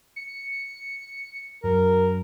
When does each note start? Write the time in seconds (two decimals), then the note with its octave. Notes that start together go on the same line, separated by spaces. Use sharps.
0.16 C#7
1.64 F#2 A#4